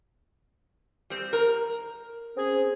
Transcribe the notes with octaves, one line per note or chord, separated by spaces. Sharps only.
G3 C4
A#4
C4 C#4 G#4